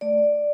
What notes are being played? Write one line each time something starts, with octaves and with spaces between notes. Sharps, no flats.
A3 D5